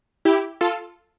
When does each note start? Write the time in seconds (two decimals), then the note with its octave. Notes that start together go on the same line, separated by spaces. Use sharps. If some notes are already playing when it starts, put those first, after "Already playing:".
0.25 E4 G4
0.61 F4 A4